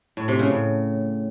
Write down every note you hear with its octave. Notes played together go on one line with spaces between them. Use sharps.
A2
C3
C#3
A2